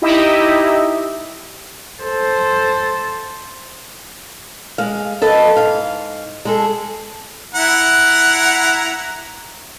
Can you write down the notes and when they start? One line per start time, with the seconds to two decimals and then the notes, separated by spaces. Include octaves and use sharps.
0.02 D#4 E4 G4 D#5 E5
2.03 A4 C5
4.78 G#3 F5
5.22 A4 B4 D#5
5.56 G#2 F5
6.45 G#3 G#4 A4
7.54 E4 F#5 A#5